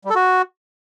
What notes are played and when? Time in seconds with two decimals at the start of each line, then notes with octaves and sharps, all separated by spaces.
0.05 G3
0.10 A4
0.15 F#4